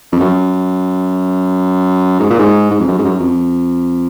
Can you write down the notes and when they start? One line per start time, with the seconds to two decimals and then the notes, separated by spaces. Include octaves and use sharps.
0.12 F2
0.20 F#2
2.20 G#2
2.30 A#2
2.39 G#2
2.71 G#2
2.80 F2
2.88 F#2
2.98 G#2
3.04 F#2
3.20 F2